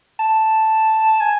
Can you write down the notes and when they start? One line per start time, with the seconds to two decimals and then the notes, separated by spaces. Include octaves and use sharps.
0.20 A5
1.21 G#5